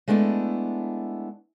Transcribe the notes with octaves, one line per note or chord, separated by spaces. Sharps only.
G#3 A3 B3 D4 E4